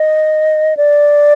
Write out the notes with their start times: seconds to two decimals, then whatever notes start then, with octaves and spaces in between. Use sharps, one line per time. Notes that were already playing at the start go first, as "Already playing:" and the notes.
Already playing: D#5
0.77 D5